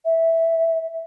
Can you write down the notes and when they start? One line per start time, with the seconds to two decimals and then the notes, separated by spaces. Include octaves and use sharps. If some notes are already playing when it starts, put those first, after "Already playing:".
0.05 E5